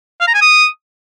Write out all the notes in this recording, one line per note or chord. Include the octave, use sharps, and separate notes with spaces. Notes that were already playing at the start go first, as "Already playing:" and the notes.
F5
A#5
G#5
D#6